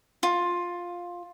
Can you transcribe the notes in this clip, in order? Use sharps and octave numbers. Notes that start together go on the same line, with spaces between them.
F4